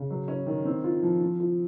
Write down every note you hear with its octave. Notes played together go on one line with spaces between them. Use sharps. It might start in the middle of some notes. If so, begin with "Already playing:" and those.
Already playing: C#3
F#3
C#4
D#3
C4
F4
F3
C4
F4